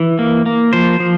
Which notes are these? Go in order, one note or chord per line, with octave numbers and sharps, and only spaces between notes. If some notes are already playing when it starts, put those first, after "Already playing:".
Already playing: E3
A#3
A#3
F3 C5
F3